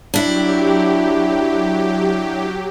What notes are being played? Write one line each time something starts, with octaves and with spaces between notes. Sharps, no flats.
F#3 D4 E4 G4